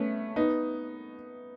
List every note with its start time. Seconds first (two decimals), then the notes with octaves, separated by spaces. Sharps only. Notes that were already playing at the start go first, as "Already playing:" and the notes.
Already playing: A3 B3 C#4
0.36 B3 D#4